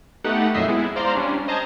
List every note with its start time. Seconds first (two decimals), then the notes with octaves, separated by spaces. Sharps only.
0.24 A3 B3 D#4 G4 F#5
0.54 F2 A#2 F#3 D#5 E5 C7
0.68 G#3 B3 E4
0.96 C5 D5 F5 A#5 C6
1.14 G3 C#4 D4
1.48 C5 D#5 A5 A#5 G#6